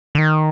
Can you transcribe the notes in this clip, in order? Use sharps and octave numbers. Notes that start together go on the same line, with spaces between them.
D3
D#3